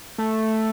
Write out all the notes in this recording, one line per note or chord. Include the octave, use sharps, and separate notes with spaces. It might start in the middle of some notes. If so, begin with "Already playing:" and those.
A3